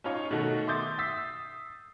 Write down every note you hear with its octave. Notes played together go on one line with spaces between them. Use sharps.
C#4 D#4 F4 C#5 C#6
B2 D#3 A3 D#4 F#4 A4
E5 C6 D6 D#6 G6 A6
D#6 E6 A6 B6 C7